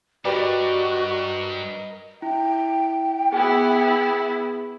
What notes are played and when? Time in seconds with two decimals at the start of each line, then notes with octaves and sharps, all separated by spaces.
0.25 G2 F#4 G4 A#4 B4 D5 D#5
2.22 E4 G5
3.33 B3 E4 G#4 G#5